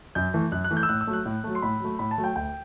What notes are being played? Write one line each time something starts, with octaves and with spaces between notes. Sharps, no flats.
F#2 G6
E3 A3
F#2 F#6
F#6
E3 A3
G6
E6
A2 F#6
E6
F#3 A3
F#6
A2
F#3 A3
C6
A2 B5
F#3 A3
A2 B5
A5
F#3 A3
G5
D2 G5